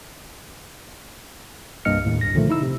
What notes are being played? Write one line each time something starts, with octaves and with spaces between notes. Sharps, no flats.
C2 G2 A#3 D#5 F6 C#7
D#2 A2
C2 G2 A#6
A#2 D3 D#3 F3 A3
D#4 E4 E6
C3